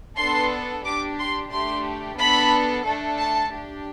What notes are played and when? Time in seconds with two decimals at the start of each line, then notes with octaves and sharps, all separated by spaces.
0.17 B3 D4 A4 C6
0.84 D4 G4 D6
1.18 C6
1.51 A3 D4 G4 C6
2.17 B3 D4 A4 B5
2.84 A3 D4 A4
3.18 A5
3.51 D4 G4